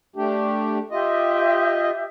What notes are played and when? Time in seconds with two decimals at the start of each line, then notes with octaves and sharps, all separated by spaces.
0.16 A3 D4 G4
0.91 F4 G4 D#5 E5